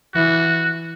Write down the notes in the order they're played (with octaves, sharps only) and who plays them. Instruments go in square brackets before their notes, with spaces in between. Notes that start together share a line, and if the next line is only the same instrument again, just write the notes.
[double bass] E3 [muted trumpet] F#4